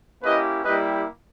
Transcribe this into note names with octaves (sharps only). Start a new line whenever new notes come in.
A#3 C#4 E4 G4 B4 D#5
G3 A#3 E4 G4 B4 D#5